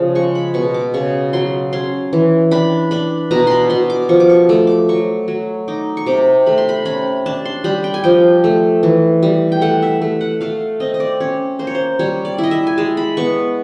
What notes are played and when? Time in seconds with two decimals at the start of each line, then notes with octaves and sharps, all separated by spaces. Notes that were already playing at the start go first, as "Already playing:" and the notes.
Already playing: C#3 F3
0.15 G#3 C#6
0.35 B5
0.54 B2 C#6
0.74 D6
0.94 C#3 C#6
1.33 F#3 C6
1.73 C#4 C6
2.13 E3
2.51 D4 B5
2.91 D4 B5
3.31 B2 A#5
3.47 B5 C6
3.70 B2 C6
3.90 D6
4.09 F3 C#6
4.20 D6
4.29 C#6
4.49 A3 D6
4.67 D6
4.89 F#3 C#6
5.28 F#3
5.68 D#4 D6
5.97 C#6
6.07 C3 D6
6.46 A3 B5
6.58 C6
6.69 B5
6.85 C#4 B5
7.26 D4 A5
7.45 C6
7.64 G3 B5
7.84 G5
7.94 G#5
8.04 F3 G5
8.44 A3
8.83 E3
9.23 G3
9.52 G5
9.61 A3 F#5
9.82 E5
10.02 A3
10.21 F#5
10.41 A3 F5
10.80 C4 D#5
10.94 D#5
11.00 D5
11.20 C#4 C#5
11.59 A#3 C5
11.67 C#5
11.75 C5
11.99 G3 C#5
12.25 D5
12.38 E4
12.43 D#5
12.51 E5
12.67 G#5
12.78 G#3 A5
12.97 B5
13.17 B3 C#6